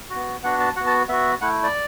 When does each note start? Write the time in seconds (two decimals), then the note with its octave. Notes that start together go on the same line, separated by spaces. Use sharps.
0.10 F#4
0.15 B3
0.43 B3 D4 F#4 F#5
0.60 A5
0.76 B3 F#4 F#5
0.87 A5
1.08 B3 F#4 E5
1.41 A3 E4 F#5
1.63 D5